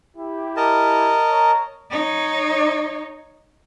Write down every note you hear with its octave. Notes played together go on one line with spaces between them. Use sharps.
E4 G4
A#4 D#5 A5
C#5 A#5
D#4 C#5